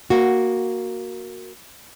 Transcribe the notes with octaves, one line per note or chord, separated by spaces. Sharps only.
A#3 F#4